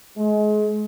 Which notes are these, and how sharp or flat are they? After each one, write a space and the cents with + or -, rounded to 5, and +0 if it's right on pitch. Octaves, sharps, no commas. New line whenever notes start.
G#3 +30